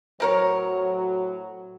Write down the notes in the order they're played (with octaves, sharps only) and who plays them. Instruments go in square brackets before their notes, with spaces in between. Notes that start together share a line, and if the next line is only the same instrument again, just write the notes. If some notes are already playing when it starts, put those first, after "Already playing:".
[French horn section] A2 F#3 [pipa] C4 A#4 C#5